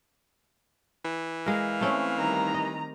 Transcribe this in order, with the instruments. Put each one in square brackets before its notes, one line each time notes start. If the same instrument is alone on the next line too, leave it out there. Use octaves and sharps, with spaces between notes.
[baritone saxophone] E3
[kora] G#3 A#4 [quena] F5
[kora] A3 C4 C#4
[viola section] D#3 G3 A#5
[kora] D#5